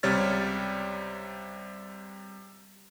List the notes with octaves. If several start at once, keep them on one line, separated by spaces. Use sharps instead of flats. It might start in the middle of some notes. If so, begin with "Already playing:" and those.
C#2 C3 G3 C#5 F6 A6